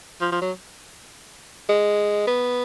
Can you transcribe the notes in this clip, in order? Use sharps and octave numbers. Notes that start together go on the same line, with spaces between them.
F3
F3
F#3
G#3
B3